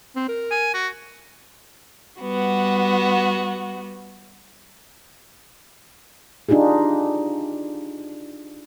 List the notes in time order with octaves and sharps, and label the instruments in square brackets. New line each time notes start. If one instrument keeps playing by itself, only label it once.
[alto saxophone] C4
A#4
[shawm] G#5
F#4
[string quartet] G3 B3 F#4
[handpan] D4 D#4 F4 G4 G#4